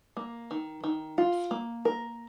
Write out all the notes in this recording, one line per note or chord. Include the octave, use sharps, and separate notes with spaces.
A#3
D#3
D#3
F4
A#3
A#4